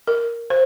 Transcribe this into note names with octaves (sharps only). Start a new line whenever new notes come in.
A#4
C5